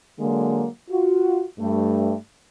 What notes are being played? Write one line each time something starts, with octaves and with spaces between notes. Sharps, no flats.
D3 F#3 G#3 A#3
F4 F#4
G2 A3